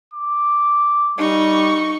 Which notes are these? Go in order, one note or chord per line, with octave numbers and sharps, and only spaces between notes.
D6
G3 D#4 C#6